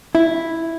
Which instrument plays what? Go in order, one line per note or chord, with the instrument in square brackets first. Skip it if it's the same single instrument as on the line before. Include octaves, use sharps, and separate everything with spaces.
[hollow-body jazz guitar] E4